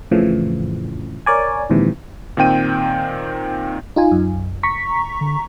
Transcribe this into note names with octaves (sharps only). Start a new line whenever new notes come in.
F2 A2 C#3 E3 F3
A#4 C#5 D5 G#5
A#1 D#2 G#2 C3 E3
A#2 D#3 C4 G5 D#7
D#4 F4 G#5
F#2
B1
F1 A#5 C#6 B6
D3